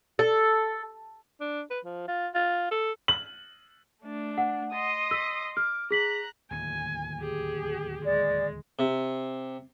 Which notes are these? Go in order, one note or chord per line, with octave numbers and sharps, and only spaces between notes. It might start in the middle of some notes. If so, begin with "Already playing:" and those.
A4
D4
B4
F3
F4
F4
A4
F#7
A3 D4
F#5
D#5 C6 D#6
E6 B6
D6 F6
G#4 A#5 F#6 B6 F#7
D1 D#2 G#5
G4 G#4
G#3 D5
C3